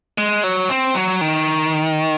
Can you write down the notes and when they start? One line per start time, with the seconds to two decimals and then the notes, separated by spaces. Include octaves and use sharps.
0.18 G#3
0.43 F#3
0.69 C4
0.95 F#3
1.21 D#3